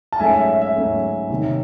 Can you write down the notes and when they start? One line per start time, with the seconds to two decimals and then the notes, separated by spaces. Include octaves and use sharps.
0.12 A5
0.20 G#2 F#3 A3 C#4 E5 G#5
0.34 E5
0.48 E5
0.62 E5
0.75 G#2 F#3 A3 C#4
1.30 C3 D#3 F#3